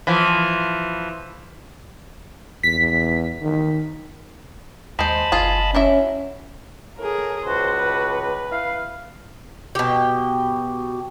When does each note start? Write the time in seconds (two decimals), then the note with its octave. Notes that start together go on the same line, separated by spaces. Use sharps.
0.07 E3 F3
2.63 E2 B6
3.42 D#3
4.99 D#2 G#3 C5 D#5 A5 B5
5.32 F#1 F4 G#4
5.75 F#3 C#4 E4 E5
6.98 A2 G#4 A#4
7.45 C#2 F#4 C5
7.76 B4
8.52 E4 F5
9.75 B2 G4